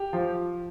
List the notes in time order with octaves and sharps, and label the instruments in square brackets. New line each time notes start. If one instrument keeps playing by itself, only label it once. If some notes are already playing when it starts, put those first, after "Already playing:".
Already playing: [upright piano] G4
F3